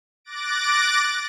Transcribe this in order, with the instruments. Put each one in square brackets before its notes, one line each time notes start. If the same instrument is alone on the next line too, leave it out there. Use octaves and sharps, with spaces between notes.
[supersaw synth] D6 F#6 A6 A#6 D7